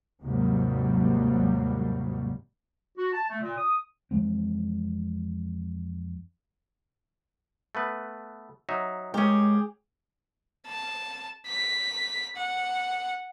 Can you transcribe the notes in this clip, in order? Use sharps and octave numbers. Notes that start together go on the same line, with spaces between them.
D#2 G#2 C3 F#3 G3 A#3
F#4
A5
A3
A#2
D#6
F2 E3 G#3 C4
A3 B3 B4
F#3 D#4 E5
D#3 G#3 C#4 G4 G#4
A5
B6
F#5